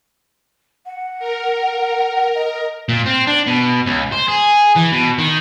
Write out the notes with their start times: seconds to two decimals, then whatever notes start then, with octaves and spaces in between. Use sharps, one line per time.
0.86 F#5
1.19 A#4
2.35 D#5
2.89 A#2
3.06 C4
3.27 D4
3.46 B2
3.86 C#2
4.12 C5
4.28 G#4
4.76 E3
4.93 B2
5.18 D#3